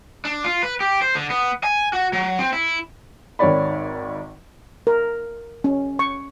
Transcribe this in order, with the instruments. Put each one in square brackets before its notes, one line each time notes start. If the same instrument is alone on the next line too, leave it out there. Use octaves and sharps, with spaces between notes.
[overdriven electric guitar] D4
F4
B4
G4
C5
D3
B3
G#5
F#4
F#3
C4
E4
[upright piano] G#1 D#3 C#5 D5 B5
[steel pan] A#4
C#4
C#6